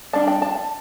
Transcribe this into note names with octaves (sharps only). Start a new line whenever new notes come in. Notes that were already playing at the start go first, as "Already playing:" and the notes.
G3 D4 A5
G5
A5